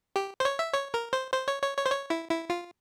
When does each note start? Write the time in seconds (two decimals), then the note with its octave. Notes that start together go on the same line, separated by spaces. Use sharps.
0.16 G4
0.40 C5
0.45 C#5
0.59 E5
0.74 C#5
0.94 A#4
1.13 C5
1.33 C5
1.48 C#5
1.62 C#5
1.77 C#5
1.86 C5
1.91 C#5
2.10 E4
2.30 E4
2.50 F4